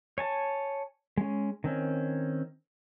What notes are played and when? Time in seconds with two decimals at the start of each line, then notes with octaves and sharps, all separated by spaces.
0.18 C#5 G#5 A5
1.17 G#3 C#4
1.64 D#3 C4 C#4